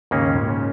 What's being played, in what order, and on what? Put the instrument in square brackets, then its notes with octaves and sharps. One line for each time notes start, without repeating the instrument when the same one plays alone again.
[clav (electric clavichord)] D#2 C#3 A#3 C#4 [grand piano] G#2
[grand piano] G#2
A#2
C#3